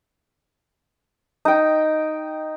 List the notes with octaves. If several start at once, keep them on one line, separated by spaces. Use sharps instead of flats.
D#4 G5